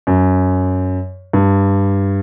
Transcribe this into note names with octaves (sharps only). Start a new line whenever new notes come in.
F#2
G2